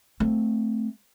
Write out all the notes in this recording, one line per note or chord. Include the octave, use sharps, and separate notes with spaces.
A3 C4